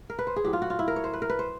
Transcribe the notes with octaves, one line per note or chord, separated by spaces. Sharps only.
A#4
B4
C5
G#4
A2 F#3 G4
F4
F#4
F4
E4
A#4
C#5
C5
B4
A#4
B4
C5